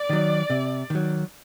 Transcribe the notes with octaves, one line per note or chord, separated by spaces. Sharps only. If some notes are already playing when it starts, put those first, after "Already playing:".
Already playing: D5
D#3 F#3
C3
D#3 F#3